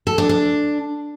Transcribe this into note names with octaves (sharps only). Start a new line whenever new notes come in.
A4
D4
D4